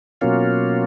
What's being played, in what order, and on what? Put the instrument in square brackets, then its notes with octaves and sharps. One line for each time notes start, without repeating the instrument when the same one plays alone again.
[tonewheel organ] B2 F#3 A#3 C#4 F4